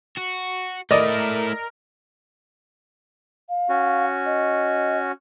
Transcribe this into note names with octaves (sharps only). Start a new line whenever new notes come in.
F#4
A3 E4 A#4 D5 D#5
F5
C#4 F#4
D#5